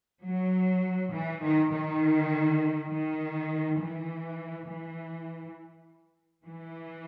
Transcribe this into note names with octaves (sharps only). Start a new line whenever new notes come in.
F#3
E3
D#3
D#3
D#3
E3
E3
E3